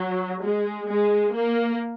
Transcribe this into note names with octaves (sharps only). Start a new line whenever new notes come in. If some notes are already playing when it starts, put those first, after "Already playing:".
Already playing: F#3
G#3
G#3
A#3